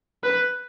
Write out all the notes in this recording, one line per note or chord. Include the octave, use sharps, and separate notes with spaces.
B4